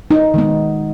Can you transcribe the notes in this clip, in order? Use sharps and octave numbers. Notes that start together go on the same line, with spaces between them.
D#4
D#3 G#3 B3